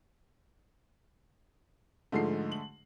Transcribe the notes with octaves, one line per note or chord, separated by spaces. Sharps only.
G#2 D3 F3 G#3 A3 C7
F#7